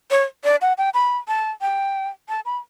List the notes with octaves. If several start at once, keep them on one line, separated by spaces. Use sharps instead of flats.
C#5
D5
F#5
G5
B5
A5
G5
A5
B5